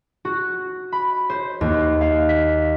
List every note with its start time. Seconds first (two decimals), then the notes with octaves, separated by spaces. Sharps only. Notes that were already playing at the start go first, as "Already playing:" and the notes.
0.25 F#4
0.92 B5
1.30 C5
1.61 D#2
2.01 F5
2.29 B6